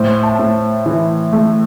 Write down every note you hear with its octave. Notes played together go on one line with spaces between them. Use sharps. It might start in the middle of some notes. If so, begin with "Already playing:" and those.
Already playing: A2 C5
A5
A2
E3
A3